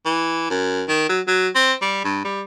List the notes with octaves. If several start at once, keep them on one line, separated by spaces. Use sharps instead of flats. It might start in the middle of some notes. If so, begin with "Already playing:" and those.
E3
F#2
D#3
F#3
F#3
C4
G3
G2
G3